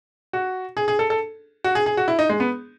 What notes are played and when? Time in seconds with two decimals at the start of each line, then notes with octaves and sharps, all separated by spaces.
0.33 F#4
0.77 G#4
0.88 G#4
0.99 A4
1.10 A4
1.64 F#4
1.75 G#4
1.86 G#4
1.97 F#4
2.08 E4
2.19 D#4
2.30 G#3
2.40 B3